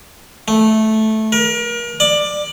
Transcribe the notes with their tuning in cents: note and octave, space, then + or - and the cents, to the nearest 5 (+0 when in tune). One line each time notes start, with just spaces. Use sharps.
A3 -10
A#4 +35
D5 +15